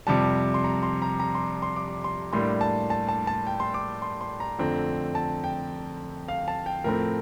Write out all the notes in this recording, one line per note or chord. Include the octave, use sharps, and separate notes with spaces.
F2 C3 G3 A5
C6
A#5
C6
A#5
A#5
C6
C6
D6
C6
A2 G3 A#3 D4 C6
A5
A5
A5
A5
G5
C6
D6
C6
C6
A#5
F2 D3 A3 C4
A5
G5
F5
A5
G5
A2 F3 A3 C4 A#4